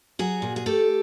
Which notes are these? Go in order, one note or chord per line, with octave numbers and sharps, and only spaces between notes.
F#3 F#4 G#4
A#2
G#4
A3 G4 A4